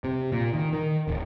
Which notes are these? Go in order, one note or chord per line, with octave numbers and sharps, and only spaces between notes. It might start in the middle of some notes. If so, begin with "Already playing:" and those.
C3
A#2
D#3
D#3
D1